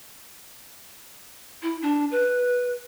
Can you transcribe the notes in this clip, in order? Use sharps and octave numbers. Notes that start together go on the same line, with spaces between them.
E4
D4
B4